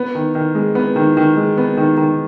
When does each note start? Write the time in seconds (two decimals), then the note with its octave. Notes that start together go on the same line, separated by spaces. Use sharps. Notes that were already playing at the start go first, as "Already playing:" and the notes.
Already playing: B3
0.15 D#3
0.35 D#3
0.55 G#3
0.75 B3
0.96 D#3
1.17 D#3
1.37 G#3
1.58 B3
1.77 D#3
1.97 D#3